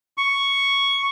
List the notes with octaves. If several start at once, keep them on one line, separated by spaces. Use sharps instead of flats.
C#6